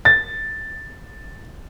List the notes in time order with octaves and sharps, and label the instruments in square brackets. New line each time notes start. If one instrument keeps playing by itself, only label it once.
[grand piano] A6